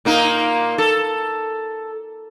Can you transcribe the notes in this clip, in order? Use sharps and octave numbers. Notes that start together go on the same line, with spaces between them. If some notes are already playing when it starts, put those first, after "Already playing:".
A#2 A#3 D#4
A4